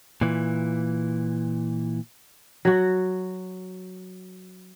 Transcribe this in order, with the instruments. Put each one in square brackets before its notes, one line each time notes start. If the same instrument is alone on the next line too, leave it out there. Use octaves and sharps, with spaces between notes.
[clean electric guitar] A#2 E3
[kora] F#3 F#4